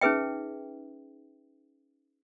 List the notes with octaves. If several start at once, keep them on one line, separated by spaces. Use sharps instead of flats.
C#4 D#4 G#4 B4 E5 G5